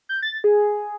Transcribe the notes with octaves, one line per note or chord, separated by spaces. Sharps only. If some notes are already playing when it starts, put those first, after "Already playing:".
G6
A6
G#4